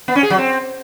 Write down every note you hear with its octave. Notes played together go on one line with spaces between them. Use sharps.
B3
C#4
G#4
F#3
C4